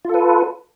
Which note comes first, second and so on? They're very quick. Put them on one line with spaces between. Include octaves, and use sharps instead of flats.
F4 A4 B4